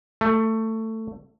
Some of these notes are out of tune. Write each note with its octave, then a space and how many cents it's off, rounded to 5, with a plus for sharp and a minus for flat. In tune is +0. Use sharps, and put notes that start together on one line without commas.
A3 +15